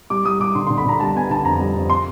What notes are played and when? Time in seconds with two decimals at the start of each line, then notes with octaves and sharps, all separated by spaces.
0.10 G3 D6
0.25 G3 D#6
0.40 G3 D6
0.55 D3 C6
0.67 C6
0.70 D3
0.78 B5
0.85 D3 A#5
1.00 G3 A5
1.15 B3 G#5
1.30 D3 A5
1.45 F2 A#5
1.60 G3
1.75 F2
1.90 C6